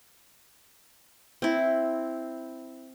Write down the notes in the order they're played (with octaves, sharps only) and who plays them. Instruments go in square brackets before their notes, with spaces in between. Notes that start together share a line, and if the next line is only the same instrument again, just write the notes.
[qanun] C4 E4